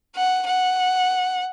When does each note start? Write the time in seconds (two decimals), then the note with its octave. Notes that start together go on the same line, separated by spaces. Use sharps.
0.15 F#5
0.46 F#5